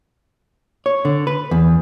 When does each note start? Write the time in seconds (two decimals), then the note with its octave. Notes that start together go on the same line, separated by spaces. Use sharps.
0.86 C#5
1.05 D3
1.27 B4
1.51 E2